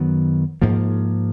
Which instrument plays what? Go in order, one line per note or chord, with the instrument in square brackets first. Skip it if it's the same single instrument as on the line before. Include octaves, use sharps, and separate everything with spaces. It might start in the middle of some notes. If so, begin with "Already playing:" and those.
Already playing: [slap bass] F#2 D#3 F#3 B3
G#2 F3 A#3